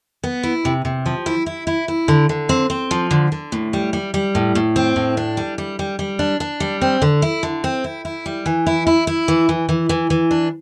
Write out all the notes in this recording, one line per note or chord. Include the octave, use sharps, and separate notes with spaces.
B3
E4
C3
C3
F3
E4
E4
E4
E4
D3
D3
C4
C4
F3
D3
D3
A2
G3
G3
G3
A2
A2
C4
A2
D4
G3
G3
G3
G3
D4
D4
G3
C4
D3
E4
D3
C4
E4
E4
G3
E3
E4
E4
E4
E3
E3
E3
E3
E3
D4